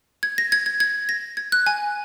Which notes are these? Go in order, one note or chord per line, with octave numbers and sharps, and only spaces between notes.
G#6
A#6
G#6
G#6
G#6
A#6
G#6
F#6
G#5